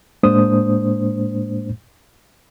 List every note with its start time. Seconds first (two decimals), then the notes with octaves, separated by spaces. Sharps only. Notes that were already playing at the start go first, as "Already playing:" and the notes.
0.23 A2 G#3 A#3 D4 C5 D#6